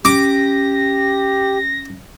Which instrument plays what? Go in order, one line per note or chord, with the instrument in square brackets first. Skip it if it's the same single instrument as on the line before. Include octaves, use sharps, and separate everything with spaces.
[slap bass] C#4 [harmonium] G4 [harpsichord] D6 [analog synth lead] A#6